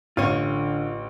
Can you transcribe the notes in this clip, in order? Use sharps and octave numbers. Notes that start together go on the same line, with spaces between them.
A1 D3 F4 C#5 D#7